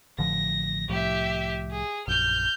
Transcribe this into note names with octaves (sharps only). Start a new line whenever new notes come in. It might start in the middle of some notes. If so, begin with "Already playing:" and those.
A1 D3 F3 A#6
C2 A2 F3 G4 E5
G#4
A#1 F#2 F6 G6